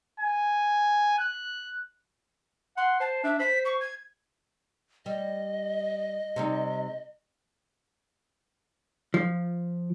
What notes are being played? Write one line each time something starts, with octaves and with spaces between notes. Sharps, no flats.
G#5
F#6
F#5 C6
C5 A5
D4 E5
C5 B6
C#6
G#6
G3 D#5
C3 G3 D#4
F3